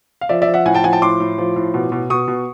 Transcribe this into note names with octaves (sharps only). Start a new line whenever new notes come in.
F5
F3 D5 E5
D5 E5
F3
E5 F#5
A2 F#5 G#5
G5 A5
F3 F#5 G#5
G5 A5
A2 C6 D6
A2
F3
A2
B2
B2
B2 C#6 D#6
B2